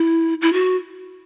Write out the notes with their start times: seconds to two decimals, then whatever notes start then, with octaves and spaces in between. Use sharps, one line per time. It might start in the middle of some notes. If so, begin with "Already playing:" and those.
Already playing: E4
0.42 E4
0.53 F#4